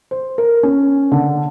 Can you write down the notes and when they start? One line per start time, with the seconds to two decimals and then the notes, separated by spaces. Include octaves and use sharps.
0.11 C5
0.38 A#4
0.63 C#4
1.12 D3